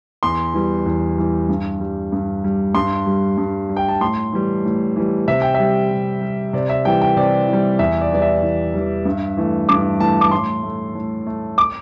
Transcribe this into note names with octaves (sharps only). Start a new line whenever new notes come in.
E2 C6
E3 G3
E2
E3 G3
G2
G3
G2
G3
G2 C6
G3
G2
G3
G5
A5
A2 C6
E3 G3
A2
E3 G3
C3 E5
G5
E5
G3
C3
G3
C3 D5
E5
E3 G3 G5
G5
C3 D5
E3
G3
E2 E5
D5
E3 G3 D5
E5
E2
E3 G3
G2
E3 A3
G2 D6
E3 A3 A5
D6
A2 C6
A3
A2
A3
D6